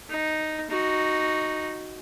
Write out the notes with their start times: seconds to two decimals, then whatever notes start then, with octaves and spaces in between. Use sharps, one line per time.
0.10 D#4
0.70 D#4 F#4